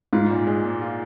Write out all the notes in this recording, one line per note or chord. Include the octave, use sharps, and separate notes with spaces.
G#2 F4
A#2
G#3
A#2
F4